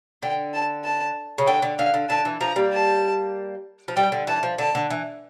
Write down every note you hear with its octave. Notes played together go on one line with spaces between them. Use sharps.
D3 G5
A5
A5
C#3
D3 G5
D3
D3 F5
D3
D3 A5
E3
F3 A#5
G3 A#3
A5
F3
G3 G5
D3
E3 A5
F3
D3 A5
D3
E3